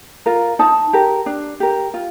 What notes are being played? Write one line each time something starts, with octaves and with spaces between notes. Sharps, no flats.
F4 A#4
D#4 A5
G4 A#4
D4
G4 A#4
F4